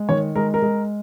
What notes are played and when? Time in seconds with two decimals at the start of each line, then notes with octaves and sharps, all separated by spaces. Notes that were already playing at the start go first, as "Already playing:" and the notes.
Already playing: G#3
0.09 D#3 C#5
0.36 G#3 A#4
0.54 A#4
0.62 G#3